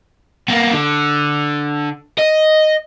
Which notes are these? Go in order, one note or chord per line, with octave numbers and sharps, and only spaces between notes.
A#3 B3
D3
D#5